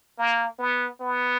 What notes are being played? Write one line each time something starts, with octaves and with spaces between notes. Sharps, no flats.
A#3
B3
B3